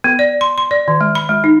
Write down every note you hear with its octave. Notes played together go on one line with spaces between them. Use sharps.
B3
D5
C6
C6
D5
D#3
G#3
B5
G#3
D#4